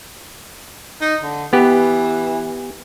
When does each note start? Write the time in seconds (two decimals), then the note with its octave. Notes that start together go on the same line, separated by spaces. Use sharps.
1.01 D#4
1.23 D3
1.53 E3 B3 G4